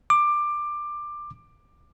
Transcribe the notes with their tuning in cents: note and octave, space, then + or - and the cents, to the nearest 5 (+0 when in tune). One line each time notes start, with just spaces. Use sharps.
D6 +15